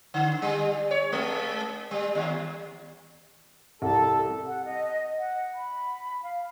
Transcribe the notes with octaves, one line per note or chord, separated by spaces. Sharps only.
D3
G3
C#5
G#3
G3
D#2
C2 A4
F#5
D#5
F#5
B5
F5